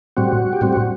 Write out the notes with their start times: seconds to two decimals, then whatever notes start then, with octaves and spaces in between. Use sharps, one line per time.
0.17 A2 G3 C4 F#4
0.53 G4
0.61 A2 G3 C4 F#4
0.73 F#4